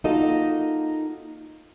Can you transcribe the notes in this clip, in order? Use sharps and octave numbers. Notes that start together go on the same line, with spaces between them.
A#3 D#4 F4 F#4 A4 D#5